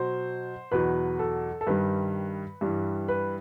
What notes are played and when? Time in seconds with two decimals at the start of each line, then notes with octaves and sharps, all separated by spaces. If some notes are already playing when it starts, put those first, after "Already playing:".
Already playing: B2 F#3 C5
0.71 E2 B2 F#3 B4
1.19 A4
1.61 A4
1.67 G2 D#3 G3 B4
2.61 G2 E3 G3
3.08 B4